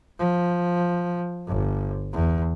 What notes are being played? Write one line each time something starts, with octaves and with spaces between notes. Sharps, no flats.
F3
G1
E2